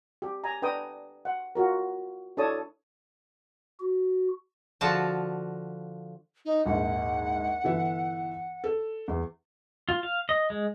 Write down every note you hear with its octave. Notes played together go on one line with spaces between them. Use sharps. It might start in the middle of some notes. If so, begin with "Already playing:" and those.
G4
G#5 A#5
D4 B4 G5 A#5 D#6
F#5
F4 F#4 A#4
D4 E4 A4 C#5 A5 D#6
F#4
D3 F3 F4 F#4 A5
D#4
A#1 D#2 G#2 F#5
G1 E3 E5
A4
E2
F4
F5
D#5
G#3